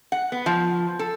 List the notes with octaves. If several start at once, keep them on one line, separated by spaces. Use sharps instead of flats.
F#5
B3
F3
A4